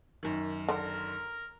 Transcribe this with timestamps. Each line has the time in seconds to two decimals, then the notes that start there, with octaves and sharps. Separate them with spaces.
0.23 F#2 D#3
0.69 D3 A#4